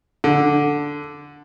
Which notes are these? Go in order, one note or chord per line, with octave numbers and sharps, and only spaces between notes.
D3